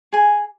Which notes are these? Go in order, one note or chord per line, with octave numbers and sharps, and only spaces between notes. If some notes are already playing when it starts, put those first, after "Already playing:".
G#4 G#5